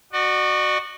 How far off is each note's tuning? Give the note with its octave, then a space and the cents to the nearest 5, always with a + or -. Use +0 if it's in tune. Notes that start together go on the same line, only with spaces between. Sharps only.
F#4 +0 D5 +45